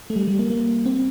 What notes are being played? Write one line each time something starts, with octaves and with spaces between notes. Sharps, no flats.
A3
G3
G3
A#3
A#3
C4